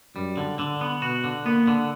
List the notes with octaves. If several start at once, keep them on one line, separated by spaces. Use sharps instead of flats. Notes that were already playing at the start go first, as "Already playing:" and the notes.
F#2 G3
D3
D3
B3
B2 F#4
D3
A#3 B3
D3